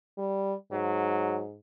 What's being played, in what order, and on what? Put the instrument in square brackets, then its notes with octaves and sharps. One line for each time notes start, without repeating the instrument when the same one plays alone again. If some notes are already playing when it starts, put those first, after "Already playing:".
[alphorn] G3
[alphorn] G#2 [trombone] F#3